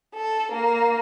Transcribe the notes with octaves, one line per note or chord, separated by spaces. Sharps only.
A4
A#3